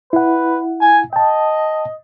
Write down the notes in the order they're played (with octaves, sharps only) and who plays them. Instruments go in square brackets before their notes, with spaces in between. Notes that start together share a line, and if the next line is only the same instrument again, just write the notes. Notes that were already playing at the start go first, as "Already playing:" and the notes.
[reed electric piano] E4 F#5 [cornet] B4
[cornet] G#5
[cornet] D#5 [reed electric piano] G5 A5